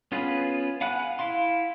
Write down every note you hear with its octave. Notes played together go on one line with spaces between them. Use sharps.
B3 C#4 F4 G#4 B4
F5 F#5 G#5 B5 F#6
E4 F5 C6